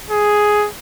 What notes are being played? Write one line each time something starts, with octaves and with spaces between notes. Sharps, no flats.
G#4